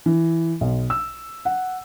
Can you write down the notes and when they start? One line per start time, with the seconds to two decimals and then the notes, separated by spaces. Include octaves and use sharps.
0.06 E3
0.61 B1
0.90 E6
1.45 F#5